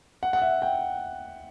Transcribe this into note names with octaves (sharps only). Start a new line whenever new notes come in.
F#5
F#5
E5
G5